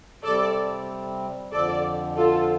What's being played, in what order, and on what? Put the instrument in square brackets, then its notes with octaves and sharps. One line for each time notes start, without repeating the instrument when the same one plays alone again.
[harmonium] C3 G3 C4 [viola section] A4 D5
[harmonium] F2 D3 F3 [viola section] A4 D5
[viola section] F4 A4